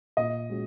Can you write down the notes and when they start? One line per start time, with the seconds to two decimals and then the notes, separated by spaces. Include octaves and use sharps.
0.17 A#2 D#5
0.50 G#3 C#4 F#4